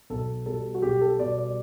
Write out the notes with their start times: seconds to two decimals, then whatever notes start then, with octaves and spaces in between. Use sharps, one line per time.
0.10 B1 A4
0.46 B2 G3 A4
0.74 F#4
0.82 B1 G4
1.01 A4
1.19 B2 G3 D5
1.38 D5